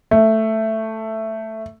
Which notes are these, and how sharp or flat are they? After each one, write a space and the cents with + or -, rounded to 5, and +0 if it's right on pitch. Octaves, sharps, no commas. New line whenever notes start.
A3 +5